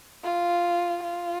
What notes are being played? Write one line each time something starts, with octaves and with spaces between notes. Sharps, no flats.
F4
F4